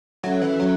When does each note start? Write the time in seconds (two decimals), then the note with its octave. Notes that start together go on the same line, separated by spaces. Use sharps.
0.23 F#3 C#4 F#4 A4 E5
0.42 E3
0.60 F#3 C#4 F#4